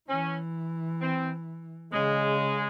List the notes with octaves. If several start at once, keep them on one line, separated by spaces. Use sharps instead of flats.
E3 C#4
C4
C#3 G#3